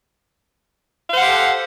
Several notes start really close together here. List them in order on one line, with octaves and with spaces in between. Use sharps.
F5 C5 F#5 G4 A4